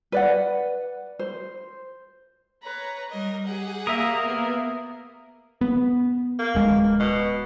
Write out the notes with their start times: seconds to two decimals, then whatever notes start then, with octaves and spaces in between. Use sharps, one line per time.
0.12 B4 D5 F#5
1.19 C5
2.63 B4 C#5 A#5
3.10 G3 A#4 D#5
3.44 G4 G#4 F#5
3.87 A#3 A#4 E5 D#6
4.24 A#3 B3
5.61 B3
6.39 A#3
6.55 D1 G#3
7.00 B2